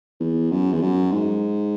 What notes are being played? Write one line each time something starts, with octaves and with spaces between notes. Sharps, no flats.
E2
F#2
E2
F#2
G#2